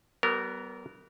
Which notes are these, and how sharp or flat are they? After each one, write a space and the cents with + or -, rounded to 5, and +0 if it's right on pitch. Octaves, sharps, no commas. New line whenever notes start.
G3 -40 B3 +0 A#4 -15